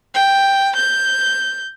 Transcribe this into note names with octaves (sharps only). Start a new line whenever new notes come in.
G5
G6